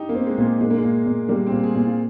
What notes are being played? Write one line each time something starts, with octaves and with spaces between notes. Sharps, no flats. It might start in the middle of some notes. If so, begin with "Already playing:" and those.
Already playing: D#4 G4
A#3
C4
G#3
A#2
G#3
A#2 G#3
A#3
A#2 G#3
A#2
G3 A#3
C4
A#2
G#4
A#2
F4